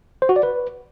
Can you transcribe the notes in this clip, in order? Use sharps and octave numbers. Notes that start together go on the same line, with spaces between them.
C5
F#4
D5
B4